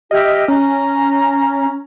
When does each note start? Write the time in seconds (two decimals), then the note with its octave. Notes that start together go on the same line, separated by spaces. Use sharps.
0.11 G4 D#5 E5 F6
0.48 C#4 A#5